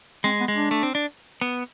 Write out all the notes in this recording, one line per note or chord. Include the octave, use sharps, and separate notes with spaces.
G#3 C4
B3
G#3
D4
A3
C4
D4
B3